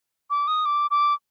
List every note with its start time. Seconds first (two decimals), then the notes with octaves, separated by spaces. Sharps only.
0.30 D6
0.48 D#6
0.65 D6
0.91 D6